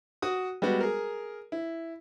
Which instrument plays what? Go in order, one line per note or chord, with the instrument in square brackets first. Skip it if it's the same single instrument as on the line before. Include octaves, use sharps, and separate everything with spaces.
[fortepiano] F#4 D#6
G3 G#3 B3 F#4
G#4 A#4
E4